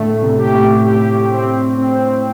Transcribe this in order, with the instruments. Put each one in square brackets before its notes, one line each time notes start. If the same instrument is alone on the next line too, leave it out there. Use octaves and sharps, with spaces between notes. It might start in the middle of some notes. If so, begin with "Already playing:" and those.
Already playing: [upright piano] A2 D3 [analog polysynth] A3
[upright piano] C3
[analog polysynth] G4
[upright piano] A2
[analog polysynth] G4
C4
C4